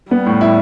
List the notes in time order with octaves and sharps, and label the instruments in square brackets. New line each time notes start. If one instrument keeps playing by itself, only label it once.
[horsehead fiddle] G3 [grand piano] B3
[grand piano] A2
E4